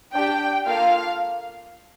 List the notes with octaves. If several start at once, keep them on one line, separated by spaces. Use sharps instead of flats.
D4 G4 G5
A#3 F4 A4 F5